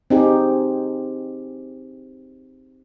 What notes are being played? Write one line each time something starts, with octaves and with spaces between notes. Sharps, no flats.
C4 D#4 G4 G#4